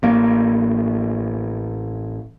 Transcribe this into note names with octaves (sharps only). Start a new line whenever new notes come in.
A1 A#3